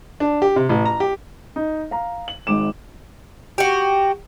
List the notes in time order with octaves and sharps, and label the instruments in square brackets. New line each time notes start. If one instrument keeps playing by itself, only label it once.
[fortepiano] D4
G4
C3
A1
A#5
G4
[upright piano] D#4
F5 A#5
F#7
G#1 G#2 D6 E7
[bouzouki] F#4 G4